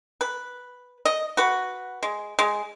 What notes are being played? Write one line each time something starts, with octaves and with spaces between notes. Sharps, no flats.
B4
D#5
F#4 B4
G#3
G#3